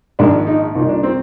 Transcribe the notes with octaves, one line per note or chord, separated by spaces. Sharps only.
A#1 G#2 D#3 D4
D#4
C2 A#2 D#4
D4
C4